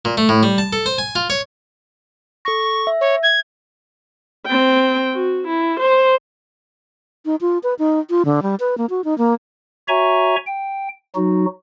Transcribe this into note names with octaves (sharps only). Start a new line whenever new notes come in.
A#2
A3
A2
G3
A5
A4
C5
G#5
F4
C#5
A4 C#6 A#6
E5
C#5
G#6
C4 G5
F#4
E4
C5
D#4
F4
B4
D#4
F4
D3
G3
B4
A#3
F#4
D#4
A#3
F#4 C#5 E5 G#5 A#5 C#6
G5
F#3 D#4 F#4